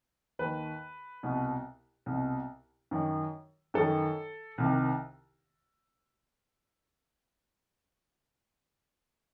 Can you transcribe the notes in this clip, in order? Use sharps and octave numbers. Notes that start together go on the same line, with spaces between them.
D#2 D#3 B4
C2 B2
C2 B2
F#2 D#3
F#2 D#3 A4
C2 C3 D#3